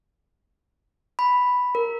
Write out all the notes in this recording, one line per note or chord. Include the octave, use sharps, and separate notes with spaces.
B5
A#4